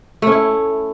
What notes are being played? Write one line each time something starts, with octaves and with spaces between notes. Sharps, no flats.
A3 C#4 E4